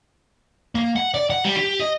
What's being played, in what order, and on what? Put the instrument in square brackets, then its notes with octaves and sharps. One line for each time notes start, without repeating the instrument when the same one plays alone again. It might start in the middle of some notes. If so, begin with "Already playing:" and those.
[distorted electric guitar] A#3
F#5
D5
F#5
G3
G4
D#5